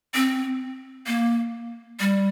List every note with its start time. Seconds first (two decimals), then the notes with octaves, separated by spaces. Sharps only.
0.15 C4
1.07 A#3
2.00 G3